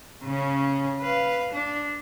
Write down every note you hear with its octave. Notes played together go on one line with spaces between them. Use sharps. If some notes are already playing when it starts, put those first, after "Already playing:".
C#3 C#4
B4 F5
D4